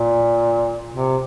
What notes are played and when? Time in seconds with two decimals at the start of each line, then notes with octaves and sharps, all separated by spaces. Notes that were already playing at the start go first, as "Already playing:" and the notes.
Already playing: A#2
0.93 C3